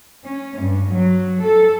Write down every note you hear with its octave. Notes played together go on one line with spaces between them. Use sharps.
C#4
G2
F#3
A4